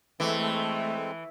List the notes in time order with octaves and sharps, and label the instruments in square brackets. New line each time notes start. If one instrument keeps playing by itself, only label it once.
[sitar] E3 [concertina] G#3 C4 A4 [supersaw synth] A3